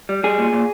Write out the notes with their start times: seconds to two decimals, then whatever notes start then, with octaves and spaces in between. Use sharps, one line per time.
0.09 G3
0.23 G3 G#4
0.38 A#2
0.53 A#2